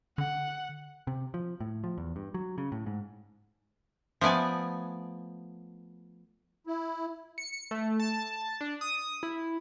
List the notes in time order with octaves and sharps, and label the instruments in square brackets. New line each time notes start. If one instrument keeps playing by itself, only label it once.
[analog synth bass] D3 [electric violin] F#5
[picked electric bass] C3
F3
A2
F3
E2
G2
F#3
C#3
A2
G#2
[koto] F3 A3 B3 D5 G#5
[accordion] E4
[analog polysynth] C#7
A3
A5
D4
D#6
E4